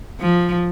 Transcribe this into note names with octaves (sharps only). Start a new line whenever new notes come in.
F3